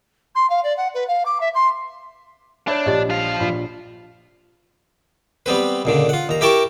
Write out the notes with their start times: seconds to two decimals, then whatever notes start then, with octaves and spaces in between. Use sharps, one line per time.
0.35 C6
0.50 F5
0.63 D5
0.77 F#5
0.94 B4
1.08 F5
1.26 D6
1.40 E5
1.55 C6
2.68 D4 C#5 D5 E5 B5
2.86 A#1 G4 D#5
3.10 F3 F5
3.40 A#1 F4 B5 B6
5.46 G3 B3 C4 B4
5.85 C#2 A#2 D3
6.09 F4 F#5
6.29 D#2 A#5
6.41 E4 G4 A#4 G5 A5 C#6